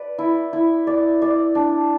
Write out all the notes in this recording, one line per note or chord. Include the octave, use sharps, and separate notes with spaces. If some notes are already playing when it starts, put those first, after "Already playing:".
Already playing: B4 D5
E4
E4
D5
D5
D4